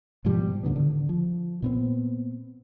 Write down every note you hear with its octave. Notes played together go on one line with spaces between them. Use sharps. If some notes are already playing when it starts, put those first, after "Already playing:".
G#2 B2 F3 G3
A2 D3 D#3 B3
D3
F3
A#2 B3 C4